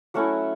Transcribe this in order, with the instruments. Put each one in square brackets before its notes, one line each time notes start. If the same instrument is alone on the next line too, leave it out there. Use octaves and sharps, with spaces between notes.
[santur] F#3 A3 C#4 E4 F#5